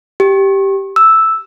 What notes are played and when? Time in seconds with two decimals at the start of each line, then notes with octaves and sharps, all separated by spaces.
0.20 G4
0.96 E6